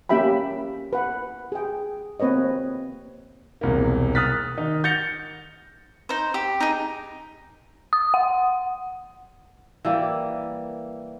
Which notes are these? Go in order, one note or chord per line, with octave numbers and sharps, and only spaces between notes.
A#3 C#4 G4 E5 G5 B5
B4 F#5
G#4 G5
A#3 C4 B4 C#5 D#5
E1 C2 A#3
D#6 F6 F#6 A6 B6
D#3 D#4 D#5
G6 A6 A#6 C#7 F7 G7
D#4 C5
G4
D#4 G#4
D#6
F#5
E3 G3 A#3